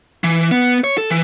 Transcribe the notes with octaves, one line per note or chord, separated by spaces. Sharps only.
E3
B3
C#5
A4
E3